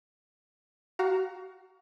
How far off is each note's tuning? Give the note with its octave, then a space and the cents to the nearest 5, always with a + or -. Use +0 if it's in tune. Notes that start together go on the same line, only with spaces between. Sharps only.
F#4 +30 F5 +25 A#5 +0